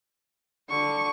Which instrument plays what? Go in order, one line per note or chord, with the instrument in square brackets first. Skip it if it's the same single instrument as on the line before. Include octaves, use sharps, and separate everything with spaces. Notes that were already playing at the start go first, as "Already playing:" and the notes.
[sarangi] D3 [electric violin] C#6